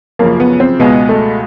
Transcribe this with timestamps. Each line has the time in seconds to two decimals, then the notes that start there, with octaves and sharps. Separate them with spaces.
0.19 F#2 C#3 F3 A#3
0.40 B3
0.60 C4
0.79 C#2 B2 G#3 B3
1.09 A3